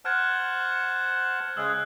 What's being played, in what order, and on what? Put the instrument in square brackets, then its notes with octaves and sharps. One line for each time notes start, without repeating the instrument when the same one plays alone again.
[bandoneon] C5 F#5 A5 [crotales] F6 F#6 G#6
[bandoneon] C#3 G#3 G#4 [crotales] E6 F#6